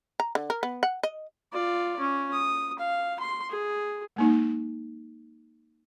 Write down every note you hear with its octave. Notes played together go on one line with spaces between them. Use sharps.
A#5
D3
A#4
B3
F#5
D#5
F4 D5
C#4
D#6
F5
C6
G#4
G#3 A#3 D#4